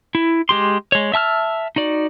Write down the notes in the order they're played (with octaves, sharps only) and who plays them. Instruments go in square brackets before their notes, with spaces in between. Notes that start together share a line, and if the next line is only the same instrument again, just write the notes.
[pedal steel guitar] E4
G#3 G4 C6
G#3 C#5
E5 A5 E6 F6
D#4 F#4 D5